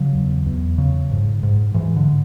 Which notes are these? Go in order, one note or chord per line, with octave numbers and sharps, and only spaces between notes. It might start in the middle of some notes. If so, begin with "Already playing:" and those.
Already playing: C#3 F#3
E2
E2
C#3
G#2
G#2
G#2 E3
D3